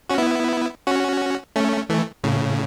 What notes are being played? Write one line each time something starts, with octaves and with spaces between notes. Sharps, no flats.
C#4 F#4
B3 E4
C#4 F#4
A3 C#4
E3 A3
A2 C#3